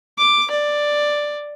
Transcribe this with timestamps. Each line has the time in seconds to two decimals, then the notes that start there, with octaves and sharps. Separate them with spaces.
0.18 D6
0.51 D5